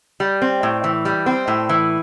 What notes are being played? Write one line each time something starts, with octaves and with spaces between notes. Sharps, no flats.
G3
C4
A2
E3
G3
C4
A2
E3